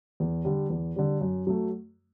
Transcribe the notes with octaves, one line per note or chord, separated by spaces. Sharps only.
E2
D3 G3
E2
D3 G3
F#2
F#3 A3